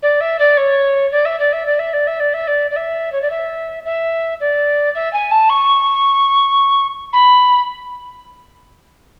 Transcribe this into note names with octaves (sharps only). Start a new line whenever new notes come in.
D5
E5
D5
C#5
D5
E5
D5
E5
D5
E5
D5
E5
D5
E5
D5
D5
E5
C#5
D5
E5
E5
D5
E5
G#5
A5
C#6
B5